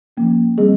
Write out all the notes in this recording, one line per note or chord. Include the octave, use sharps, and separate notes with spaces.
F3 A#3 C#4
D#3 G3 C4 G#4